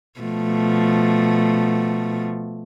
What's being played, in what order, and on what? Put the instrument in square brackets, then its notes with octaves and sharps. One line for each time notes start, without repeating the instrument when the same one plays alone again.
[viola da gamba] B2 F3 A3